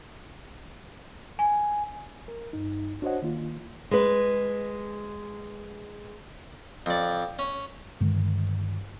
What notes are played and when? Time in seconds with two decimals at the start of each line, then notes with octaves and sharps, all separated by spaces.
1.39 G#5
2.28 A#4
2.53 G2 D#4
3.02 D4 F#4 C5 C#5 D#5 F#5
3.22 D#3 A#3 F4
3.91 G#3 B4
6.86 F2 D5
7.39 C#4
8.01 G2 D3 D#3 G#3